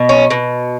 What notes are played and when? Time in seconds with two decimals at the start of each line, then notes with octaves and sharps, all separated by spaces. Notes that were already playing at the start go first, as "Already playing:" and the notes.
Already playing: B2
0.09 C#4
0.30 B2